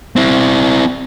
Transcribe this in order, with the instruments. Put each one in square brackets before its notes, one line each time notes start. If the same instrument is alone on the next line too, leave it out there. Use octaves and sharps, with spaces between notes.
[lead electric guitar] C4 E4